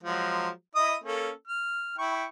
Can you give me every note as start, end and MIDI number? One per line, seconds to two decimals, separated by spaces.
0.03 0.49 53
0.03 0.49 54
0.03 0.49 56
0.75 0.95 64
0.75 0.95 75
0.75 0.95 87
1.04 1.30 58
1.04 1.30 61
1.04 1.30 69
1.47 1.96 89
1.98 2.25 64
1.98 2.25 79
1.98 2.25 85